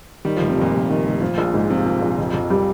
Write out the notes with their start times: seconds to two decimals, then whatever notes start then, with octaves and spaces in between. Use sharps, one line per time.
0.25 D#3 G3
0.37 F1 F3
0.49 C3
0.57 F2 A#2
0.73 F1
0.89 D#3
1.05 F1
1.21 F3
1.38 A#1
1.54 G#2
1.70 C3 F3
1.86 F3
2.02 A#1
2.18 F2
2.34 F2
2.50 G3